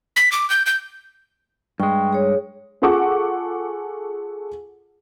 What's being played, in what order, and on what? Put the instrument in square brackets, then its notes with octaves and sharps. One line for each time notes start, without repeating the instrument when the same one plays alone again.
[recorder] B6
D6
G6
G6
[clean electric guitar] G2 G#3 [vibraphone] G5 C#6
[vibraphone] G#4 C#5
[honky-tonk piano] F4 G#4 A4 F#5 C#6 D6